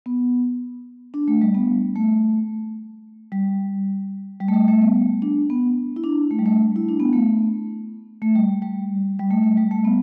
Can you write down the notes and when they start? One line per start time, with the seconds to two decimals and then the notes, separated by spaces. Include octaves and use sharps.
0.06 B3
1.14 D4
1.28 A3
1.42 G3
1.55 B3
1.96 A3
3.32 G3
4.41 G3
4.48 A3
4.54 G3
4.68 A3
4.82 B3
5.22 D4
5.50 B3
5.96 E4
6.04 D4
6.31 A3
6.39 G3
6.46 A3
6.76 E4
6.89 D4
7.00 B3
7.13 A3
8.22 A3
8.35 G3
8.62 G3
9.19 G3
9.31 A3
9.43 A3
9.57 G3
9.71 A3
9.85 B3